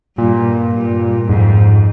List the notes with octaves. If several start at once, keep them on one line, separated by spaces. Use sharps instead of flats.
G2 A#2
G2
F2 G#2